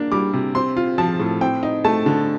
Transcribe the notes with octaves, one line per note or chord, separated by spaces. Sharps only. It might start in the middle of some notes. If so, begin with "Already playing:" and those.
Already playing: A#3 D4
G3 D6
C3
C4 C6
F4
F3 A5
A2
C4 G5
D#4
A3 A5
D3